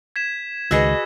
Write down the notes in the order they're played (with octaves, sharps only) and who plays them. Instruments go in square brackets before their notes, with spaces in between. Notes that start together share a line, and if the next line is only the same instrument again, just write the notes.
[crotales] G#6 B6 E7
[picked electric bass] C#2 D#3 [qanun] F#4 G#4 B4 [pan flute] D#5 [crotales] E6 G#6